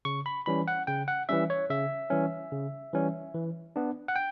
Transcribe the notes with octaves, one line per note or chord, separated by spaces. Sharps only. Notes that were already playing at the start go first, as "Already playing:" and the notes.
C#3 C#6
B5
E3 G3 C#4 B5
F#5
C#3 G5
F#5
E3 G3 C#4 E5
C#5
C#3 E5
E3 G3 C#4
C#3
E3 G3 C#4
E3
B3 D4
F#5
G5